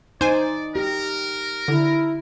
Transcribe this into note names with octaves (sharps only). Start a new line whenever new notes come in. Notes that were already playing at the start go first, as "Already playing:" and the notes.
D#4 C5 D5 G#5
G4 A#4
D3 E4